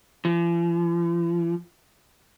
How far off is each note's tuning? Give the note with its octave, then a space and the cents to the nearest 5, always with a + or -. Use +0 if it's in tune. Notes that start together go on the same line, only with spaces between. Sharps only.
F3 -45